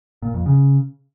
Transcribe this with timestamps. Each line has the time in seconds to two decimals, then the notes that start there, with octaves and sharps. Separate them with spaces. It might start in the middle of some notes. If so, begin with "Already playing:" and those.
0.22 A#2
0.34 F2
0.46 C#3